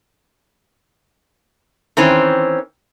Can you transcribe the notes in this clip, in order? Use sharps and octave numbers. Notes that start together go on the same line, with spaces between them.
D#3 E3 C4 C#4